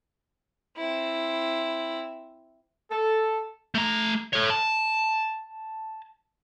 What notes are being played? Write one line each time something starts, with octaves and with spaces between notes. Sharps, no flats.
C4 E4
A4
A3 A#5
A4 C#5
A5